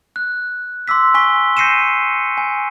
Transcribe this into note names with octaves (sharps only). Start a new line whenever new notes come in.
F#6
C6 D6 E6 B6
G#5 C#6 B6 G7
G6 A#6 C7 C#7 D#7 E7
G#5